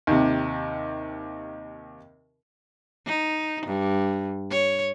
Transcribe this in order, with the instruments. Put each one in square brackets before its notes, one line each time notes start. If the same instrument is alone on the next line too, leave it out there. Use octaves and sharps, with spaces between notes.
[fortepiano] D#2 C3
[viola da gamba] D#4
G2
C#5